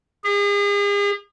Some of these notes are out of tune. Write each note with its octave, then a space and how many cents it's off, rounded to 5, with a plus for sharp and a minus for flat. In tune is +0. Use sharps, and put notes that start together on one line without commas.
G#4 -40